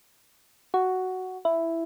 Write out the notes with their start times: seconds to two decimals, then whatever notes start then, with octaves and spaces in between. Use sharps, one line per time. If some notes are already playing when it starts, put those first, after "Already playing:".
0.74 F#4
1.45 E4